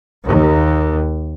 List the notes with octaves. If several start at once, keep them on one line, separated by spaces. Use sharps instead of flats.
D#2